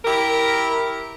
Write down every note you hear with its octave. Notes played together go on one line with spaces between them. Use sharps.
E4 G4 A#4